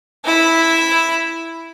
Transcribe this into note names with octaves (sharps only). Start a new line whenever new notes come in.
E4 B5